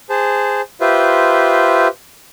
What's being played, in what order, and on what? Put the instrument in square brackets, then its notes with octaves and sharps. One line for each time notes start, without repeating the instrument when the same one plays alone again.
[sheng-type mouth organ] G#4 C5 A5
F4 G4 B4 C5 E5